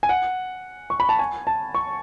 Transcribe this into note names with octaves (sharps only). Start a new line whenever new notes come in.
G#5
F#5
C#6
B5
A5
G#5
A5
C#6